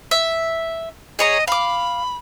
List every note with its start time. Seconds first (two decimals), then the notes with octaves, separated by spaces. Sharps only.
0.11 E5
1.19 G#4 C#5 D#5 A#5
1.48 F5 B5 D6